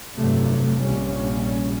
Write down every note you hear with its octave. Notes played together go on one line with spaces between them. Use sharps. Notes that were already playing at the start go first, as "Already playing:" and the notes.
F1 G2 C3 F#3 A3
A#1 C3 G3 C#4